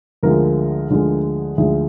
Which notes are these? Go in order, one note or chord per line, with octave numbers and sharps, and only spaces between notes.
D2 D3 F3 G#3 A#4
D2 D3 F3 G#3
D2 D3 F3 G#3 G#4